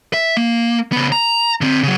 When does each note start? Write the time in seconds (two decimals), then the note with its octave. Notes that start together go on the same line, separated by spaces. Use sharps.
0.14 E5
0.37 A#3
0.92 C#3 B3
1.12 A#5
1.61 D3 C4
1.83 C#3 F#3